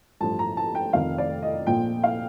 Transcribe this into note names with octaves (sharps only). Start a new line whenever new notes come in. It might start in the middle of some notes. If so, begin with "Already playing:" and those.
A1 G2 F3 A5
A#5
A5
G5
F1 F2 D#3 F5
D5
D#5
A#1 A#2 F3 G5
F5